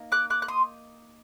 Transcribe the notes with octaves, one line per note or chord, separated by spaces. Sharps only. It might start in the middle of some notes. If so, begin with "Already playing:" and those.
Already playing: A#3 D#4
D6 F#6
D6 F#6
F#6
C6 D#6